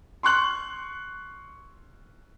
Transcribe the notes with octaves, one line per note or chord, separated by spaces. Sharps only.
C6 C#6 F#6 F#7